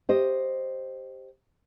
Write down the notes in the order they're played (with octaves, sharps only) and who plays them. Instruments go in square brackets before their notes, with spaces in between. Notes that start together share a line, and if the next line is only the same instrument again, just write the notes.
[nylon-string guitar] G4 C5 D#5